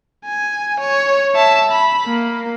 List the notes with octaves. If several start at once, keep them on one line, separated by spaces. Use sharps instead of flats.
G#5
C#5
E5 A5
B5
A#3